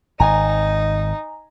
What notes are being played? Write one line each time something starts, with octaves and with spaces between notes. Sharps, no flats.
G#1 D#4 G#5 A#5